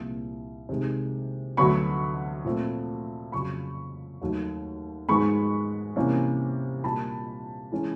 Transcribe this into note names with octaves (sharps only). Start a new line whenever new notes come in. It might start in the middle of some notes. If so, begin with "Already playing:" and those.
Already playing: C2 A#2 F3 A#3
C3 D#3 G#3
D2 D3 F#3 B3 B5 C#6
A#2 F3 A3 C4
F2 C#3 F#3 B5 C#6
D#2 D#3 F#3 A3
G#2 D#3 G#3 B3 B5 C#6
C3 E3 G3 A#3 C#4
A#2 G3 A#3 D4 A5 B5
E3 G#3 C#4